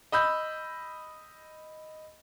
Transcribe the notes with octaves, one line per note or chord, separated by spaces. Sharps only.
D#5 B5 E6 G6